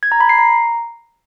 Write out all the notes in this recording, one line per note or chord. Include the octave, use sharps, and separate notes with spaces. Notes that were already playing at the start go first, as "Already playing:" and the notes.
G#6
A#5
B5
C7
A#5